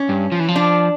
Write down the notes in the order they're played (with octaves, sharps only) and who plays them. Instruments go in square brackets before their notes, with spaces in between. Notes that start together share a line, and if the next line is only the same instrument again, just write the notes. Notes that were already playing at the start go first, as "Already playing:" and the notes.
Already playing: [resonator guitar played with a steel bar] C#4
[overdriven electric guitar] G2
F3
E3
F3
[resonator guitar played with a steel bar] D4